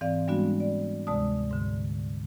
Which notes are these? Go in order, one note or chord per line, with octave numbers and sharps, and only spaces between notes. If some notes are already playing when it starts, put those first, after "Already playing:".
G#2 E3 C4 D5 F5
G3 G#3 B3 D4 F#4
D5
D2 C3 G#3 D5 A5 D#6
G#2 D3